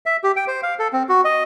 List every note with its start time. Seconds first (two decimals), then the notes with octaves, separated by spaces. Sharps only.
0.06 E5
0.24 G4
0.36 G5
0.48 C5
0.63 F5
0.79 A4
0.93 C4
1.09 F#4
1.25 D#5